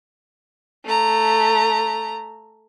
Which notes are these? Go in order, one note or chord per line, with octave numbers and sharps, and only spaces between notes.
A3 A#5